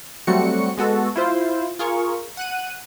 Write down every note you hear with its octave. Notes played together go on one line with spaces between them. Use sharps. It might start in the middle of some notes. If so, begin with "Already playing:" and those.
F#3 G3 A3 C4 F#4 C#7
G#3 B3 F#4 A4
E4 F4 C5
F4 G#4 A#4 C#6
F#5 F#6 D#7